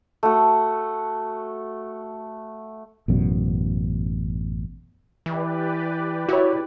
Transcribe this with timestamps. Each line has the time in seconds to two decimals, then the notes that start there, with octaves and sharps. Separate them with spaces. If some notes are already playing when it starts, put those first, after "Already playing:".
0.23 A3 F#4
3.08 A1 F#2 B2
5.26 E3 G4 B4 D5
6.29 E4 F#4 C#5